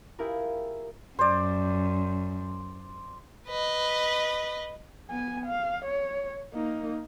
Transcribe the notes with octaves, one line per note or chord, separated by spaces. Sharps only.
E4 F4 G4 G#4 A#4
F#2 C5 D5
B4 D#5
B3 G#5
F5
C#5
A#3 D#4